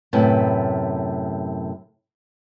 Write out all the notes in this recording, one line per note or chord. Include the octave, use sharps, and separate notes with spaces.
F#2 A2 C3 B3